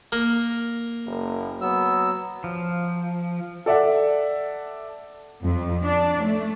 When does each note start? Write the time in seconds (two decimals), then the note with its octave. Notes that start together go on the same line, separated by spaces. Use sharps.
0.12 A#3
1.06 F#1
1.61 F#3 B3 E6
2.44 F3
3.66 A4 D5 E5 F#5
5.42 F2
5.83 D4
6.22 A3